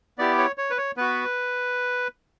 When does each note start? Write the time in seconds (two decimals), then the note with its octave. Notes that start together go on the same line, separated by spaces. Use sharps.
0.18 B3 E4 G4 D5
0.38 C#5
0.58 C#5
0.70 B4
0.78 C#5
0.97 B3 F#4 B4